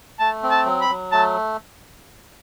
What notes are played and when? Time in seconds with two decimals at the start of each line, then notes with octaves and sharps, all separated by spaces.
0.20 A3 A5
0.43 C4
0.51 A5
0.66 F#3
0.81 B5
0.89 F#3
1.12 A3 A5